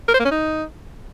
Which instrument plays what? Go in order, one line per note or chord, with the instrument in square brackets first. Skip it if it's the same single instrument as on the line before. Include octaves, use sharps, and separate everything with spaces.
[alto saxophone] A#4
C5
A#3
C#4
D#4